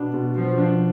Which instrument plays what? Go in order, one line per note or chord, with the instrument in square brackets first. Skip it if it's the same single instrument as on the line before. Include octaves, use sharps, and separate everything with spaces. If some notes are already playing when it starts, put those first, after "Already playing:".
Already playing: [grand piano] B2 B3 D4
B2
[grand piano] B2 [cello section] F3
[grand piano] D4